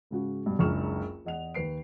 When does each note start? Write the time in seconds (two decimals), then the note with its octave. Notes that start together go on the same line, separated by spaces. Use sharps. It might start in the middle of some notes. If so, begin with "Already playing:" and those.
0.11 G#2 C#3 F#4
0.46 G2 B2
0.59 F#1 C#2 D4 C#6 F6 E7
1.25 E2 D#5 F#5 F7
1.54 D#2 B4 C7 D7